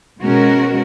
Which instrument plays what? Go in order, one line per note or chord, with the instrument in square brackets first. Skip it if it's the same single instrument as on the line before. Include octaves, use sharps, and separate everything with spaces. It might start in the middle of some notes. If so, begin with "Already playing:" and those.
[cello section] B2 G#3 C#4 F#4 A#4